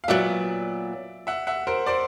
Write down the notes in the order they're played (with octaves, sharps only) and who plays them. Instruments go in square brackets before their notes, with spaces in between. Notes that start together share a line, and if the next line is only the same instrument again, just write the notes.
[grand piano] F5
[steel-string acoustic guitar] A#2 F#3 B3 [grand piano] D5 E5
[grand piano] E5 F#5
E5 F#5
A#4 C5
C5 D5